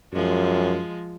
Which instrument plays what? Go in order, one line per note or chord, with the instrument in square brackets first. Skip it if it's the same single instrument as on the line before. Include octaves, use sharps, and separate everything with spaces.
[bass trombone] F#2 [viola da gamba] F3 G#3